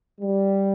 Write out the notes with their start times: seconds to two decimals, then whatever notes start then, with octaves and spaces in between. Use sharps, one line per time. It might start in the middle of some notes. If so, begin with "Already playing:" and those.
0.21 G3